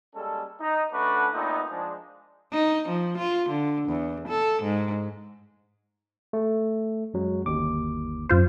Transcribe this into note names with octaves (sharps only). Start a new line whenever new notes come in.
G3 G#3 A#3 C#4 A4
D#4
D3 A3 C#4 D4 F#4 B4
A#2 A3 B3 C4 D#4
F3 G#3 D4
D#4
F3
F4
D3
E2
A4
G#2
A3
F#2 F#3 G#3
G1 D#2 D6
F#2 F4 C5